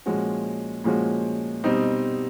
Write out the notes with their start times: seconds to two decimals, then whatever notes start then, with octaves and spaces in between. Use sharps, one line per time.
0.06 A#2 F3 G#3 C#4 F#4
0.84 A#2 F3 G#3 C#4 F#4
1.64 B2 G3 C4 D#4